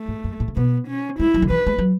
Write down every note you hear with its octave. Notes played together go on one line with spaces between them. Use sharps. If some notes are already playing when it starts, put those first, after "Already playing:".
Already playing: A3
G#2
F#2
A2
C#3
B2 B3
C#4
G#3 E4
F#3
D3
E3 B4
G#3
F#3